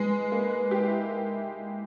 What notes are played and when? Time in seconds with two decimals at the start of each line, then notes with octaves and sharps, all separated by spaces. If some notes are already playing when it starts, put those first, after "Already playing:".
Already playing: G#3 B4
0.32 A#3
0.71 G4
0.87 E4